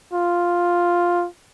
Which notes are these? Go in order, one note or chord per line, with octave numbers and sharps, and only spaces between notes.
F4